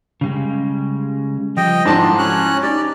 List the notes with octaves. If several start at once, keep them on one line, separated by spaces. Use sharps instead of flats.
C#3 G3 G#3
F3 G3 D#5 G5
G#2 D3 F3 D4 E4 F4 A5 C6
C#4 F#4 C#5 F#6
D#4 G4 D5